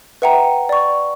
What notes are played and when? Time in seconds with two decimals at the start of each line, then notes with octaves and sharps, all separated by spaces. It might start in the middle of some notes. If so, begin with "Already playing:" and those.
0.22 B4 E5 F#5 G5 A#5
0.69 D5 C#6